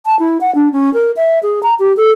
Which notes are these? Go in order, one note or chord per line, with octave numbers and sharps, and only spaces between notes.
A5
E4
F#5
D4
C#4
A#4
E5
G#4
A#5
G4
A4